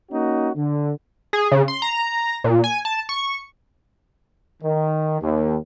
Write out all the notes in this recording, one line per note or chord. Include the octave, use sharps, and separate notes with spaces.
A#3 C#4 D#4 F#4
D3
G#4
C#3
C6
A#5
A#2
G#5
A5
C#6
D#3
D#2